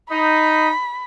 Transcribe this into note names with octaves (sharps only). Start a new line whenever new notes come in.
D#4 B5